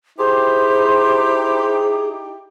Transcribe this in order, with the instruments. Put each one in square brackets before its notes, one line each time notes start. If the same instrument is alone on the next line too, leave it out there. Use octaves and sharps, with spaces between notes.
[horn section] D#4 E4 G4 [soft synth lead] G#4 [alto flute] C5 [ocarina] C6